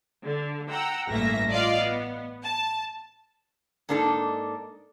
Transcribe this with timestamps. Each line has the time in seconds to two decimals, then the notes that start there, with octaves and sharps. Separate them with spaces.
0.23 D3
0.70 F#5 G5 A#5 E6
1.09 A1 G2 A3 A#3 E5 A#6
1.49 F4 D5 D#5 F5
1.77 B3
2.44 A5
3.89 G#2 A#3 D4 D#4 A4